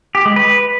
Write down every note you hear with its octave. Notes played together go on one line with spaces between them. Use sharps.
G4
G#3
B4